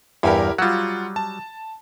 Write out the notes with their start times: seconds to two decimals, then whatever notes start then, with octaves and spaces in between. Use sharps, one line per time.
0.23 E2 G2 E4 G4 A#4
0.58 F#3 G3 F4 F#5
1.16 A5